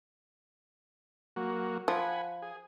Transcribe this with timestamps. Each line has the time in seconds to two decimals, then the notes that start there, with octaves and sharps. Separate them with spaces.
1.36 F#3 A#3 F#4
1.88 F3 F#5 G#5 B5
2.42 G#4